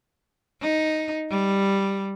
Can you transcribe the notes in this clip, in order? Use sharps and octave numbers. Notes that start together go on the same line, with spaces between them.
D#4
G3